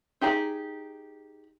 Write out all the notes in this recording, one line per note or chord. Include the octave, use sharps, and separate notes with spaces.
D#4 G4 G#4 A5 A#5